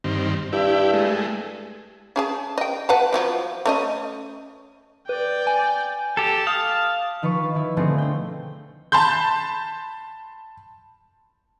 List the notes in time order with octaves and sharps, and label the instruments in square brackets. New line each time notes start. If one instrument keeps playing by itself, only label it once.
[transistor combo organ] G2 D#3 C4
[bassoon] G2 [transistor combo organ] E4 G4
[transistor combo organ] G#3 A3
[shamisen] C#4 G#4 A5
D#5 G5
B4 F#5 A5
F3 F#3 A#3
A3 C#4 D#5
[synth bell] B4 [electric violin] D5 G5
[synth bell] G#5
[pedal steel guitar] G4 A4 [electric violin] A5
[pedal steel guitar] F5 [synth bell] D#6
[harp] D#3 F3 B4 B5 C#6
D#3 E4
B2 D3 F3 A3 C4 G#4
C5 G5
[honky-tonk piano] A5 B5 C6 G6